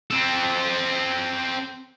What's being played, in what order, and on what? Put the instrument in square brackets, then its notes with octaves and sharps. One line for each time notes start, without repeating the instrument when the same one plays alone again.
[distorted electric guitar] C4 A4